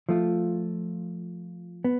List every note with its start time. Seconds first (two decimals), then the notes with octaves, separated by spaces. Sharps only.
0.09 F3 A3 F4
1.84 B3